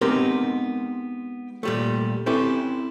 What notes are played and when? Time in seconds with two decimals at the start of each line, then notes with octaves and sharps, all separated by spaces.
0.01 G#3 B3 C4 D#4 G4 A#4
1.63 A#2 G3 A3
2.26 C4 C#4 E4 G4 A4 B4